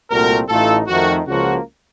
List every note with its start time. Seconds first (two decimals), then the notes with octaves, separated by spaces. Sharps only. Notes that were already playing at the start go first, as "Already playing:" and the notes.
0.10 C2 A#2 A3 C4 F#4 A#4
0.49 A1 A2 A3 D#4 F4 A4
0.88 F2 D#3 A3 F#4
1.27 C#2 C#3 F3 A#3 F#4